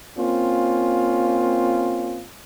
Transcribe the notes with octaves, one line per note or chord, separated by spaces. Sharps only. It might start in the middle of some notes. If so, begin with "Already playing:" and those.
A#3 C4 C#4 F4